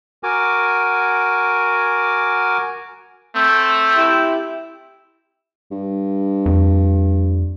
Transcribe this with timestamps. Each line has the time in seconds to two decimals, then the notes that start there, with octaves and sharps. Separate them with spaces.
0.23 F#4 A#4 G#5 D6
3.36 A3 C4 E6
3.96 E4 G4
5.71 G2
6.46 F2